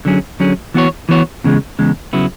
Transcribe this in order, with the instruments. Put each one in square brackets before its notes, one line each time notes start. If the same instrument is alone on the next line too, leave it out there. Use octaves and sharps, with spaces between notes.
[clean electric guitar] D3 F#3 C#4 G#4
D3 F#3 C#4 G#4
E3 B3 F#4 C#5
E3 B3 F#4 C#5
E2 C#3 G#3
E2 C#3 G#3
C#3 F#3 B3 E4